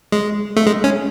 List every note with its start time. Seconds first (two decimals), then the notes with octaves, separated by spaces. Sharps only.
0.12 G#3
0.56 A3
0.66 G#3
0.84 C#4